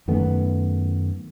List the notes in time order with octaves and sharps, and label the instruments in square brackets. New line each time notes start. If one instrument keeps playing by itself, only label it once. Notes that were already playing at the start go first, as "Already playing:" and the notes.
[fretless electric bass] F#2 D#3 A3 B3